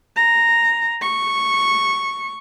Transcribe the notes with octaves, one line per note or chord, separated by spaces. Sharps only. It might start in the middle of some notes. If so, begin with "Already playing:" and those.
A#5
C#6